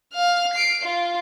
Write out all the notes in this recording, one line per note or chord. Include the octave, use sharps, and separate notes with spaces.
F5 F6
C7 D7
F4